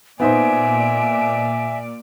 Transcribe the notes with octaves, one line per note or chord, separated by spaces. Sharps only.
A#2 B3 D#4 C5 D5 E5 G#5